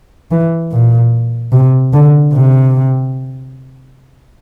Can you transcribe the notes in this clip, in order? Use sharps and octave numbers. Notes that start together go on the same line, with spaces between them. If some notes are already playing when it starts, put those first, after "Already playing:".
E3
A#2
C3
D3
C3